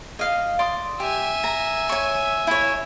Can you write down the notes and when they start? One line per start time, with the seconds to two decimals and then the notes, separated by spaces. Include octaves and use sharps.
0.19 D#5 F5
0.59 D5 C6 D#6
1.00 G4 E5 G#5
1.44 A#5
1.89 C#5 C#6
2.47 E4 C#5